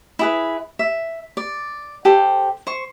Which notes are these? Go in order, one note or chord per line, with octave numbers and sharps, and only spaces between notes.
E4 G#4 B4
E5
D5
G4 A4 C5
C5 C#6